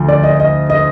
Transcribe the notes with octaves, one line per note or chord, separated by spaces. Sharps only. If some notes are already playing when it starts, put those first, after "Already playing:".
Already playing: D2 F3
D5
D#5
D#5
D#5